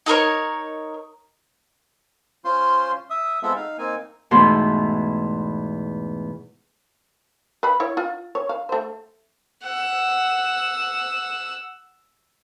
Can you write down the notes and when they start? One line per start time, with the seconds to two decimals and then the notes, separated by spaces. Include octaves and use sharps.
0.06 D#4 A4 A#4 C#5
2.45 C#4 F4 C5 C6
3.10 E5 D#6
3.42 G#3 B3 C4 F4 A4 E5
3.56 D#4 F5
3.78 A#3 C4 D#4 G#5
4.31 E2 G#2 B2 A3 C6
7.63 B4 F5 B5
7.80 E4 C#5
7.97 F4
8.35 C#5
8.49 F5
8.69 A3 C5
9.63 F#5 E6